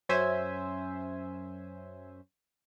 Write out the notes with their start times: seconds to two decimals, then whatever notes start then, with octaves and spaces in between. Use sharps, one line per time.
0.09 F#2 C#4 C5 E5 G#5